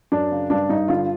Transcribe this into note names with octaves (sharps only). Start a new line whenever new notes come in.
F#2 D4
C#3
G2 D4
G2 D#4
D3 F4